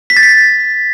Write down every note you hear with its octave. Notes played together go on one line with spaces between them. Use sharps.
B6
A6
B6